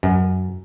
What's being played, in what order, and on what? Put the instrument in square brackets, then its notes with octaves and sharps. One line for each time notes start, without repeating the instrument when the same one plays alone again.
[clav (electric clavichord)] F#2